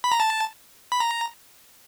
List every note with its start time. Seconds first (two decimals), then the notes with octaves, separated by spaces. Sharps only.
0.04 B5
0.12 A#5
0.20 A5
0.92 B5
1.00 A#5